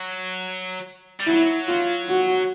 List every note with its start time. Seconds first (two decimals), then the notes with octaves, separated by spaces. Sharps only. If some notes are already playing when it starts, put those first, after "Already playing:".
Already playing: F#3
1.20 G3
1.27 F#3 E4
1.68 F4
2.09 F#4